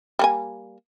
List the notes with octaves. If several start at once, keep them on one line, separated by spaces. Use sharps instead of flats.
G3 A#3 G#5